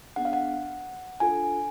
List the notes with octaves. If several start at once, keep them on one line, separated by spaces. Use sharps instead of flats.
B3 D4 G#4 F#5
F5
F#5
D4 F4 A4 G#5